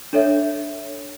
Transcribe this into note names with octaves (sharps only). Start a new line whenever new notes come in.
D4 A4 C#5 E5